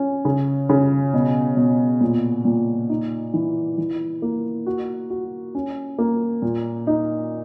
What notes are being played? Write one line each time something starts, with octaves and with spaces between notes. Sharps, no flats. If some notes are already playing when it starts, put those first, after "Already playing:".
Already playing: C#4
C#3
C#3
B2
B2
A#2
A#2
D#4
E3
E3
A#3
F#4
F#4
C#4
A#3
A#2
D#4